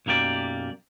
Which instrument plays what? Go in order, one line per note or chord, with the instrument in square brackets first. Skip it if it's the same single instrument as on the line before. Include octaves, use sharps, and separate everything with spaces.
[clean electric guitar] B1 F#2 A#3 G4 D5